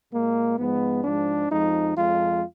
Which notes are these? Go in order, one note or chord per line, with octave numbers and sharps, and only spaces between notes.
A#2 G#3 A#3
G#2 F3 G#3 B3
G#2 F3 G#3 D4
F2 F3 G#3 D#4
F2 F3 G#3 F4